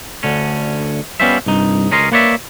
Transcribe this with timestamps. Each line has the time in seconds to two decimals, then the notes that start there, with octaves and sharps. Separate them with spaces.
0.23 D2 D3 C#4
1.20 G3 B3 C#4 F4 C5 E5
1.46 C2 G2 D#4
1.91 C#2 C#4 A#4 D#5 C6
2.12 A#3 B4 C#5 D5 E5